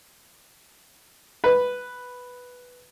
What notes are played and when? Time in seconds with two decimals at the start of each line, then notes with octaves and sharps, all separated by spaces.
1.44 B4